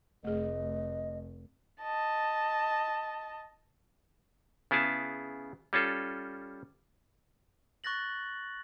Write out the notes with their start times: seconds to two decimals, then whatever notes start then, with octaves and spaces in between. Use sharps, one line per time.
0.24 F1 A3 G#4 D#5
1.82 D#5 A5
4.71 C#3 B3 E4 G#4 A5
5.73 G3 C#4 F4 A4
7.84 C#6 F#6 A6 A#6 F#7